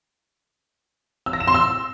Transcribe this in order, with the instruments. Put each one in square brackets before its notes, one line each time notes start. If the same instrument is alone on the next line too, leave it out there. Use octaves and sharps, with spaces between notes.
[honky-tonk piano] E6
A#6
E7
C6
E6